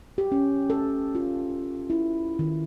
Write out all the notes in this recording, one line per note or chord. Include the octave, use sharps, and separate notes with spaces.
G4
C#4
A4
F4
E4
D#3